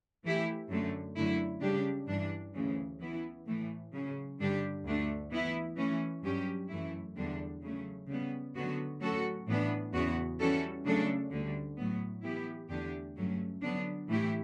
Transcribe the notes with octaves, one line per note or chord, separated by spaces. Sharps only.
E3 A3 E4 G4
F#2 D3 A3
F#2 D3 A3 E4
C#3 G3 D4 G4
G2 E3 G3 D4
D2 C#3 E3
E3 B3 E4
A2 E3 A3
C#3 F#3 C#4
G2 D3 G3 D4 G4
D2 D3 A3 D4
E3 B3 E4
E3 A3 C#4
G2 F#3 C#4 G4
F#2 E3 A3 E4
E2 D3 G3 D4
C#3 F#3 A3 C#4
C#3 G3 B3
D2 D3 F#3 B3 F#4
A2 F#3 C#4 F#4 A4
A2 E3 B3 D4
E2 C#3 E3 B3 F#4
E3 G3 C#4 F#4 A4
C#3 F#3 A3 D4 A4
D2 D3 G3
A2 F#3 B3
E3 B3 E4 G4
E2 D3 A3 D4 G4
G2 F#3 A3 C#4
D3 F#3 B3 D4
A2 E3 A3 E4 G4